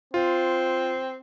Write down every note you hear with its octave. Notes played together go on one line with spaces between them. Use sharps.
C4 F4